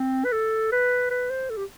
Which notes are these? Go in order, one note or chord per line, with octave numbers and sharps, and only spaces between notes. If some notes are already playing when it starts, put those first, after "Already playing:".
Already playing: C4
B4
A4
B4
B4
C5
A4
G4